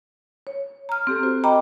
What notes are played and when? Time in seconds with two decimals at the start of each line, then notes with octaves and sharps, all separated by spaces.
0.47 C#5
0.89 A#5 F6
1.07 C4 G4 A4
1.23 F#4 C5
1.44 D#5 G5 A#5 B5 D6